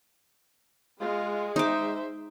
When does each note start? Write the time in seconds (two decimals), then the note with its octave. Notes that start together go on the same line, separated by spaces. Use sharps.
1.01 G#3 F4
1.56 D#4 C5 E5 D6